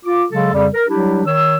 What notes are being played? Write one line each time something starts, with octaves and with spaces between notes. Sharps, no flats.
F4 D6
C#3 F#3 G#3 A4
F2 C#3 G3
A#4
F#3 G3 D4 E4 G4
D#3 C#5 E6